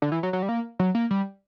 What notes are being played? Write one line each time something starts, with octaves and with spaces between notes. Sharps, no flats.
D3
E3
F#3
F#3
G3
A#3
F#3
A#3
G3